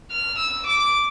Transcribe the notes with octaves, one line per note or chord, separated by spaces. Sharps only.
F6
E6
D6